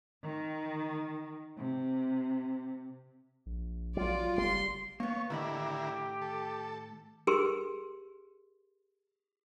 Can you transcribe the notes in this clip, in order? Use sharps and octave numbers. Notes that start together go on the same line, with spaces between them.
D#3
C3
A#1
A#1 F#3 F4 D5
F#1 G3 C6
A#3 B3 C#5
A2 D3 D#3 E4 G4 A#4 B5
A4
G4 G#4 A#4 B4 C6